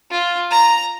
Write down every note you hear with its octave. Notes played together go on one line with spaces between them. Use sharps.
F4
A#5